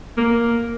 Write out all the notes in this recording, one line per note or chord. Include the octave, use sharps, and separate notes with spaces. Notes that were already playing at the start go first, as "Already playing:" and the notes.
A#3